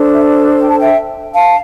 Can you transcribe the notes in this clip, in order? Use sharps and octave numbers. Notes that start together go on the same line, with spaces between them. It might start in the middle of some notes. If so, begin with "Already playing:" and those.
Already playing: D4 A4 C5
E5
G5
A5
E5 G5
F5 A5